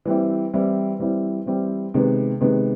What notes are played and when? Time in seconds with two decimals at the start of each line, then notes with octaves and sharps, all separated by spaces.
0.05 E3 G3 C4 E4
0.53 E3 G3 C4 E4
0.99 E3 G3 C4 E4
1.46 E3 G3 C4 E4
1.94 C3 D#3 G#3 B3
2.41 C3 D#3 G#3 B3